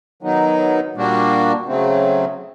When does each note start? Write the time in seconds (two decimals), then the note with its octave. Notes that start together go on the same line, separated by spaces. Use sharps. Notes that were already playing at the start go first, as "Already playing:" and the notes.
0.22 D#3 F#3 B3 D#4
0.95 A#2 G3 A#3 D4 F#4
1.67 C#3 F#3 A3 C4